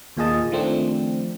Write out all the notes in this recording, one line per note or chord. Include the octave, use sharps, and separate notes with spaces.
D#2 A#2 F4 G#4 D#5 A5
D#3 F3 A3 C4 D4